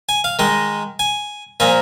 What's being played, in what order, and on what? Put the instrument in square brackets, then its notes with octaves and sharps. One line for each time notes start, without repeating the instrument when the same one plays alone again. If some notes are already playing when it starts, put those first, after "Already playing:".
[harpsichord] G#5
F5
D#3 G#3 D#5
G#5
A#2 F3 A#3 G#5